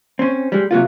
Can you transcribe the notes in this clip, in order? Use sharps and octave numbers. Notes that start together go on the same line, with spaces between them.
C4 C#4
G3 G#3
C3 F#3 A#3 F4